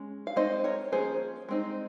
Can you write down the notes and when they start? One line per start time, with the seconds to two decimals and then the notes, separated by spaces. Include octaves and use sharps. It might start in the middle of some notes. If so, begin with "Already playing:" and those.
Already playing: G#3 C#4
0.27 F5
0.36 G#3 C4 D#4 C5 D#5
0.64 A#4 C#5
0.92 F3 A#3 C#4 G#4 C5
1.49 G#3 C4 D#4